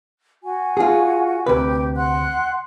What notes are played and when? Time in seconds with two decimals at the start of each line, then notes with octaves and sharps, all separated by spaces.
0.44 F#4 G#5
0.77 F4 G#4
1.46 D2 C3 G4 B4
1.96 F#5 C6 F#6